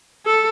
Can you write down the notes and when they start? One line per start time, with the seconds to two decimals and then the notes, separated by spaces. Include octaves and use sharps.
0.26 A4